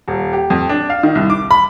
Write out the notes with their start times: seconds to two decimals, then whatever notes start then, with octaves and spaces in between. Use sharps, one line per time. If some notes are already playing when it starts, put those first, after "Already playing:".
0.08 D#1
0.33 G4
0.50 F2
0.69 D4
0.90 F5
1.03 D#3
1.15 C2
1.30 D6
1.51 B5